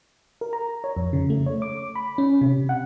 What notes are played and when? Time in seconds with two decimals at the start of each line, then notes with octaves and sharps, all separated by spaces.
0.41 A#4
0.53 A#5
0.84 C#5
0.96 F2
1.13 C#3
1.30 A3
1.46 C#5
1.62 D6
1.95 B5
2.18 C#4
2.41 C3
2.69 F#5